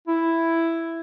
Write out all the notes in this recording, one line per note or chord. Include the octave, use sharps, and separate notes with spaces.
E4